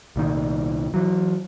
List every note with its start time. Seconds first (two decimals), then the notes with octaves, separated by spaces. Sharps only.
0.16 C2 A#2 D#3
0.94 E3 F#3